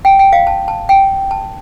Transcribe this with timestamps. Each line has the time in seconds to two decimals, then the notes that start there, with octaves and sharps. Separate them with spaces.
0.05 G5
0.19 G5
0.33 F5
0.47 A5
0.68 A5
0.89 G5
1.31 A5